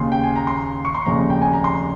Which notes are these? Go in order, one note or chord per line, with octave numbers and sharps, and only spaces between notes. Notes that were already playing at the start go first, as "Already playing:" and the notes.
Already playing: D#2 C#3 C6
G5
G#5
A#5
C6
C#6
C6
F1 D#2 C#3 A#5
G5
G#5
A#5
C6